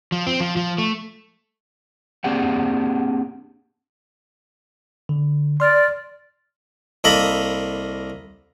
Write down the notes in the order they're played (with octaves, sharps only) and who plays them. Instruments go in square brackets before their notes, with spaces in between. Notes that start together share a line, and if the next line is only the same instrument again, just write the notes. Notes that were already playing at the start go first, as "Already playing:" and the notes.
[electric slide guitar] F3
C4
F3
F3
A3
A#3 C4 D4 G4 G#4 F#5
[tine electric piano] D3
[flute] D5 [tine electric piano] C6 F6
[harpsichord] C2 A#3 A4 D#5 B5